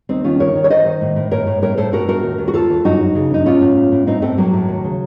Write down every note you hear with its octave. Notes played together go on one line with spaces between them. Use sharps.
D#2 C4 D#4
D#3 C#4 F4
D#2 A#4 C#5
D#3
C#5
D#3 C5 D#5
D#3
A2
A2
A2 A#4 C#5
A2
A2 A#4 C#5
A2 A4 C5
A2 F#4 A#4
A2 F#4 A#4
D#2
D#2
F#4
D#2 F4 A4
D#2
F#2 D#4 F#4
F#2
C#3
F#2 D#4
A2 C#4 F4
A2
A2
A2
A2 C4 D#4
A2 A3 C4
A2 F#3 A#3
A2
D#2
C#3